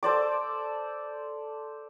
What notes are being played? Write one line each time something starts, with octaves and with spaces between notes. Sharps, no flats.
A4 C5 D5 D6